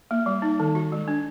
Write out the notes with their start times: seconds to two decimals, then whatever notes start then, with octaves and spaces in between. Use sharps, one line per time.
0.11 A#3
0.26 G3
0.42 D#4
0.60 D#3
0.75 F#4
0.92 G#3
1.08 D4